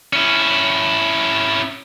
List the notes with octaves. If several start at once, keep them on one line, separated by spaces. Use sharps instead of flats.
C#4 E4